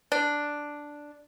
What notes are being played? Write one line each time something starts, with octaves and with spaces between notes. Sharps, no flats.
D4